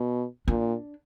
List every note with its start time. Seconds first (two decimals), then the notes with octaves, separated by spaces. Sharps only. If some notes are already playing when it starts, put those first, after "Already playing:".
Already playing: B2
0.48 A#2 D4